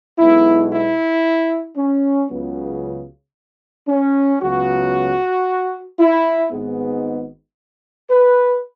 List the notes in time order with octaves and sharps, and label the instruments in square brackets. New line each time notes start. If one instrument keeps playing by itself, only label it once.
[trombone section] B1 B2 G#3 E4
E4
C#4
C#2 C#3 F#3 B3
C#4
C#2 C#3 F#3 B3 F#4
E4
G#1 G#2 G#3 B3
B4